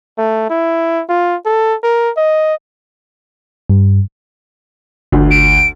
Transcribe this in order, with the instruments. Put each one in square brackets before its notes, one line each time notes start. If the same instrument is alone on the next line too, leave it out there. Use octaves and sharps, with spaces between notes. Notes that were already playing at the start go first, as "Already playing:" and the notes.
[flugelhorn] A3
E4
F4
A4
A#4
D#5
[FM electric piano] G2
[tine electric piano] G1 [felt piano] D2
[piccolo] D7